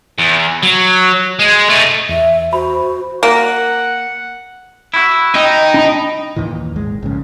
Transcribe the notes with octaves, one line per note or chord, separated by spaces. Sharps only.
E2
F#3
G#3
A3 D#4
E2 E5
F#4 C5 B5
A#3 F#5
E4 F#4
D#4 D#5 G5
D4 B5 D#6
D#2 A#2 D#3 E3
G#1 G#3
A#1 G#2 C#3